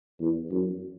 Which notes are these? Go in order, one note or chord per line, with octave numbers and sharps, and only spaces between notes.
E2
F#2